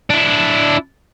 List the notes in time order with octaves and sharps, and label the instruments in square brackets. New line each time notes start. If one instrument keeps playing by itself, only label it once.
[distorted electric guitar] D4 E4